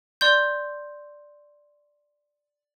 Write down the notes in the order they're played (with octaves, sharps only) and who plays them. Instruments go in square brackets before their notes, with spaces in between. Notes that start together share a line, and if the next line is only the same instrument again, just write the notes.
[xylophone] D5 C6 G6